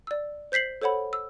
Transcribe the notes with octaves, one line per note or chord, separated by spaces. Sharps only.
D5 E6
C5 G6 B6 C7 F#7
A4 C5 C#5 F#5 B5
E6